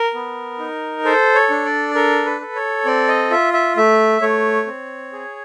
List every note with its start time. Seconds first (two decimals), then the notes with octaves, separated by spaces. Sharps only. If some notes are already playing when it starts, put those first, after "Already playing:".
Already playing: A#4
0.14 B3
0.59 D#4
1.05 A4 C5
1.35 C#5
1.50 D4
1.65 D5
1.95 A4 A#4
2.26 B4
2.41 A4
2.56 C#5
2.85 C4 D5
3.08 D#5
3.31 F4 E5
3.53 E5
3.77 A3 E5
4.21 A3 C#5
4.66 C4
5.12 G#4